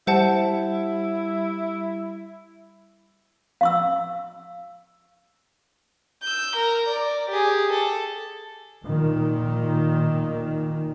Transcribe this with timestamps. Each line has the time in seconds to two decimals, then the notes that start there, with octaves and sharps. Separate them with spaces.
0.07 G3 E4 C5 F#5 A5
3.61 F5 C#6 E6
6.23 E6 G6
6.56 A#4 A#5
6.88 D5
7.30 G4 G#4
7.70 A4
8.84 A#2 D#3